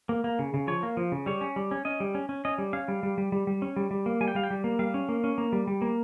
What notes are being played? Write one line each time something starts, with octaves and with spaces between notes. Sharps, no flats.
A#3
A#3
C#3
C#3
F3 C#5
A#3
F3
C#3
G3 C#5
C#4
G3
C#4
C#4 D#5
G3
C#4
C#4
C#4 D#5
G3
C#4 F5
G3
G3
G3
G3
G3
C#4
G3
G3
A#3
G3 G#5
G5
G3 F5
G5
G3
A#3
G3 F5
C#4
A#3
C#4
A#3
G3
G3
A#3